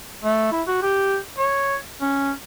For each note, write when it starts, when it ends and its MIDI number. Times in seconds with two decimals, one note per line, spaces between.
0.24 0.50 57
0.52 0.62 64
0.67 0.79 66
0.83 1.17 67
1.38 1.76 73
2.01 2.31 61